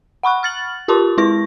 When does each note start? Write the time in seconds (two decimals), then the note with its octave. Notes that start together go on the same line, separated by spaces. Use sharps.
0.23 F#5 B5 C#6 F#6
0.43 F6 A6 F#7
0.88 F4 G4 A#4 A5 C6 D6
1.18 G#3 E4 B4 C#6 A#6